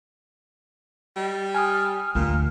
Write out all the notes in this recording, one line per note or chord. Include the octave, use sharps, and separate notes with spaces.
G3 D#5
G#5 D#6 F6
D2 A#2